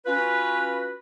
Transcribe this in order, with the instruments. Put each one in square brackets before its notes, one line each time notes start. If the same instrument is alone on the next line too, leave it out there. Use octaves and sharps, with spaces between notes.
[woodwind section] C#4 F4 F#4 B4